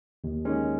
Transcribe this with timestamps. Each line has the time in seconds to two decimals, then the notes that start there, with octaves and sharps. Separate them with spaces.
0.24 D#2
0.45 D#3 G#3 C#4